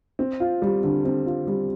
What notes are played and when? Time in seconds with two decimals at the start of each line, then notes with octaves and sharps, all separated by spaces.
0.19 C4
0.40 F4
0.62 G3
0.84 D3
1.05 C4
1.26 F4
1.47 G3